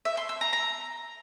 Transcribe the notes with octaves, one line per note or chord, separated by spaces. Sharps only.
E5
C6
E6
A#5
A#5